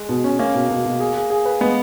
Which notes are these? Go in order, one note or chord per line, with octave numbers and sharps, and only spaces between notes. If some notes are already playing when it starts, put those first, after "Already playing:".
Already playing: G#3
B2
C#4
A#3 C#4
B2
B2
B2
G#4
G#4
G#4
B4
G#3 B3